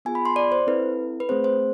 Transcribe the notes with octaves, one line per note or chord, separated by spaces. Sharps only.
B3 F4 G#4 G#5
B5
C6
D5
C5
C4 E4 A4 B4
B4
A3 C4 G#4 C5
C5